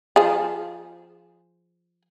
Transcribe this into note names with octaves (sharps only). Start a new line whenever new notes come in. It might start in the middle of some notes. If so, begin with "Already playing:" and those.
F3 G#4